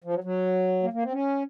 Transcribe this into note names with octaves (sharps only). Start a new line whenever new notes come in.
F3
F#3
F#3
A#3
A#3
C4
C#4